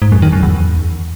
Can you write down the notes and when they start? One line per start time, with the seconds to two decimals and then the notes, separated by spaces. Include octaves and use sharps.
0.02 G#2
0.12 F#2
0.22 D#3
0.33 F#2
0.43 E2